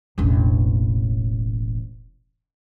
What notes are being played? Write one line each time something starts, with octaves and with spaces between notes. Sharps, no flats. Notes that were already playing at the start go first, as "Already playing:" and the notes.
E1 A1